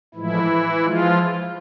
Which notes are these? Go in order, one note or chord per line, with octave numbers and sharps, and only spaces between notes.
A2 E3 F3 G#3 E4
F3 G#3 F4